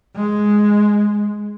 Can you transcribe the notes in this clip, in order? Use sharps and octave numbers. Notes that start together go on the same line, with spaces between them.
G#3